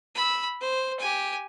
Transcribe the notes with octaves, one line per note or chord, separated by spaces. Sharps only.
B5 E6
C5
G4 G#5